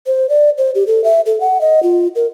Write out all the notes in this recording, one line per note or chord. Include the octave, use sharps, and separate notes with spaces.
C5
D5
C5
G4
A4
E5
A4
F#5
D#5
F4
A#4